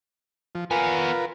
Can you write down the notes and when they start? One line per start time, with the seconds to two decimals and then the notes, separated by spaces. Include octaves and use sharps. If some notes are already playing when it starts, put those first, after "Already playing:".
0.55 F3
0.71 B3 F4 A#4 B4 G#5